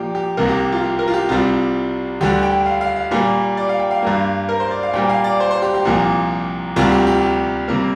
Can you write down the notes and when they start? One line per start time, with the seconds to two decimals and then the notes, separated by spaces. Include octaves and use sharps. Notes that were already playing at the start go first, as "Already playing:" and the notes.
Already playing: A#2 F3 A#3 G4 D5
0.15 G4
0.37 C2 C3 A#3 A#4
0.49 G4
0.72 F4
0.83 G4
0.99 A#4
1.08 F4
1.14 G4
1.29 C2 C3 G3 F4
2.21 D2 D3 G3 G4
2.43 G5
2.66 F5
2.81 F5
2.96 F5
3.11 A#2 G3 A#3
3.57 D5
3.69 F5
3.80 G5
3.91 F5
4.02 G2 G3 A#3
4.49 A#4
4.60 C5
4.71 D5
4.83 F5
4.93 A#2 G3 A#3 G5
5.09 F5
5.24 D5
5.40 C5
5.51 C5
5.62 G4
5.74 G4
5.85 C2 A#2 F3 A#3
6.76 D2 C3 G3 A#3 F4
6.92 G4
7.07 G4
7.23 G4
7.68 C3 G3 A#3 A#4